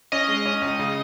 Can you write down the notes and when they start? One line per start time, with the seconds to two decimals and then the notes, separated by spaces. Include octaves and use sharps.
0.12 C#4 D#5
0.28 G#3
0.46 C#4
0.62 C#2
0.79 C#3